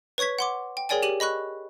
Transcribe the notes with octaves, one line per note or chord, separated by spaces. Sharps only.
B4 C#5 C#6 G#6 B6
F#5 C6 D6
G5
G#4 A#4 C#5 D5 G5 G#5
G4 D#7 F#7
D#5 B5 C#6 F#6